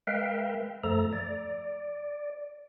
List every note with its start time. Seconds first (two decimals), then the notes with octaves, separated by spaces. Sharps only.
0.07 G#3 A#4 B4 E5 F5 G5
0.84 F#2 F3 A3 A4 A#5
1.13 D5